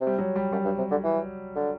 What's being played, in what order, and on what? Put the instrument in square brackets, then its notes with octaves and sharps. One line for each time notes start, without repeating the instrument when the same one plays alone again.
[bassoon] C3
[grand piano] G3
F#3
G3
[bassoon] F#2 [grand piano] G3
[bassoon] G2
C3
D3
E3
D3